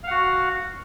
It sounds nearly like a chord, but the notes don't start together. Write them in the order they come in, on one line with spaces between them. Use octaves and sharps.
F5 F#5 F#4